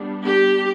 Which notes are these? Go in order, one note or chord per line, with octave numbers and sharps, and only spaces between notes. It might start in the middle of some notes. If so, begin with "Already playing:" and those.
Already playing: G3 B3 D4
G4